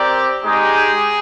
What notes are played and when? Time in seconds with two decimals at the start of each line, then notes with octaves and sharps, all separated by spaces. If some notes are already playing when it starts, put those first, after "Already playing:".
Already playing: C4 G4 A#4 D5
0.44 G#3 D#4 G4 G#4